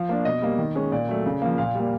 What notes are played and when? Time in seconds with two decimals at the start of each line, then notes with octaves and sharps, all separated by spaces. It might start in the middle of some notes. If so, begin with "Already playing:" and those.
Already playing: F3 F5
0.09 A#3 D4
0.25 B2 D#5
0.42 G3 A#3
0.58 D#3
0.75 G#3 C#4
0.92 A#2 D5
1.09 F#3 A3
1.26 C#3
1.42 F3 A#3
1.58 A#2 F5
1.75 G3 A#3